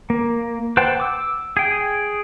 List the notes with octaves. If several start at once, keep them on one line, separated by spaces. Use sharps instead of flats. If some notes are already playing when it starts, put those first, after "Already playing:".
A#3
B4 C5 F#5 G5 A5
D6 E6
G#4 G5